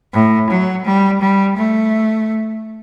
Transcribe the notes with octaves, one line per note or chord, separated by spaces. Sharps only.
A2
F#3
G3
G3
A3